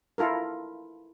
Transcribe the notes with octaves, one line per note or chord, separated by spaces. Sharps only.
E4 F4 A4 A#4